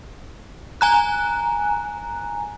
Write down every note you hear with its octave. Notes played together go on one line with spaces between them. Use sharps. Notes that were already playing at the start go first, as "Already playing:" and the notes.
G#5 A#5 F#6